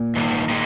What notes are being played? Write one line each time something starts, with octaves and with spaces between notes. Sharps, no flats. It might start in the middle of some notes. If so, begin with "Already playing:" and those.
Already playing: A#2
G#2 D#3 G3
D#3 G#3 D#4 G4